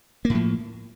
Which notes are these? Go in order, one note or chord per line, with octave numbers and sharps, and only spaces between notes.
A2 F3 A#3